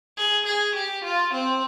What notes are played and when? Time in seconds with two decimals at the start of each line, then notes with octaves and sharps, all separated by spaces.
0.17 G#4
0.46 G#4
0.74 G4
1.03 F4
1.32 C4